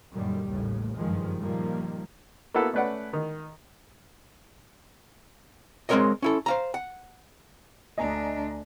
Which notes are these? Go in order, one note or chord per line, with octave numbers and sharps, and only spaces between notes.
F#2 A#2 D3 D#3 G3
A1 D#2 A2 C#3
F#1 G2 D#3 F3 G#3
A#2 D#3 F3 G3 A#3
A#3 B3 E4 F#4 A4 B4
A3 C#4 B4 D5 F#5
D#3
G#3 C4 G4 A#4 C#5 D#5
C#4 E4 A4
C5 F5 A#5
F#5
D2 D4 D#5 G#5 A#5